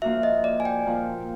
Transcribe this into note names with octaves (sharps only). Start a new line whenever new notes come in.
F3 A#3 D4 F#4 E5
D#5
D5
G#5
G5
A#2 F3 A#3